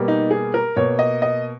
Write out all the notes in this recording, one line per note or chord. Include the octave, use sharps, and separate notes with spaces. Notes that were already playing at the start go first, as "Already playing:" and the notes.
Already playing: B2 G3 A#3
D#4
G#4
A#4
B2 A#3 C#5
D#5
D#5